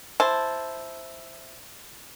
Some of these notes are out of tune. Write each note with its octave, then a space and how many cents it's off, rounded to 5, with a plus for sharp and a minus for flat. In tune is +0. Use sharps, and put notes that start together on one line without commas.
E4 +0 C5 +0 A5 +0